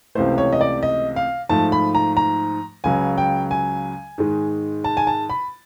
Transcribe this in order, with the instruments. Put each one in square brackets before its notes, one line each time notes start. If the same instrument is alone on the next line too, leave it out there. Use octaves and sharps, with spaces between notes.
[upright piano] C#2 C3 E3 A3 C5
C#5
D#5
D5
D#5
F5
G#2 F3 A3 A5
B5
A#5
A#5
C#2 C#3 F#3 G#5
G5
G#5
G#2 D#3 G#3
A5
G#5
A5
B5